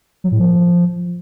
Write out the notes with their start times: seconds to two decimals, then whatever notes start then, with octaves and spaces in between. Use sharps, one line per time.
0.24 F#3
0.32 A2
0.39 F3